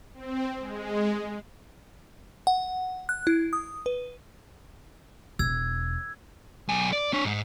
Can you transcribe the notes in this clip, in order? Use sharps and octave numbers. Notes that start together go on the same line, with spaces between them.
C4
G#3
F#5
F#6
E4
D#6
B4
E1 E6 G#6
B1 G#5
D5
D4 C#5
G#2